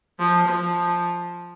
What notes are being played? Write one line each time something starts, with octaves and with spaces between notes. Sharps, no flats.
F3
F3